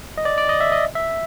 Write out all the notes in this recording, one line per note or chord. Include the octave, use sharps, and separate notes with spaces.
D#5
D5
D5
D#5
E5
D#5
E5